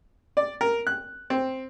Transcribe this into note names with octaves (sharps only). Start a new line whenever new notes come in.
D5
A#4
F#6
C4